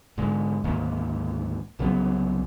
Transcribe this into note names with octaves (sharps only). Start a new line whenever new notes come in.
G#2 D3 G#3
D2 G#2 D#3 A#3
C2 C#3 F#3 B3